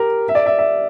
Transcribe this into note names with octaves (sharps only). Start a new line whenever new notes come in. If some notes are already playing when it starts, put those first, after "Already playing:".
Already playing: G4 A#4
E5
D5
E5
E5